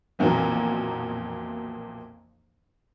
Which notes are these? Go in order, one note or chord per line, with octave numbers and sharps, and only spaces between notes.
B1 F2 A#2 E3 F#3 A#3